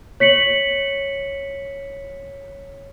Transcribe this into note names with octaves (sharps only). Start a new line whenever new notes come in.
C#5 B6 C#7 F#7